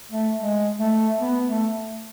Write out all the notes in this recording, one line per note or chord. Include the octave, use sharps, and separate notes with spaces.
A3
G#3
A3
B3
A3